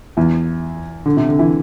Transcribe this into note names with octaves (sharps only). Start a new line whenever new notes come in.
E2 E3
D3
C3
D3
E3